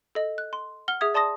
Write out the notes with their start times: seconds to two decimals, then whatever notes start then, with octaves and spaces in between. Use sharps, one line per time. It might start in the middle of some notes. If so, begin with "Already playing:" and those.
0.15 A4 D#5
0.38 F#6
0.53 C6
0.88 F#5 F6 G7
1.01 G#4 E5 D#6 G#6
1.14 D5 A5 C6 D#6 A#6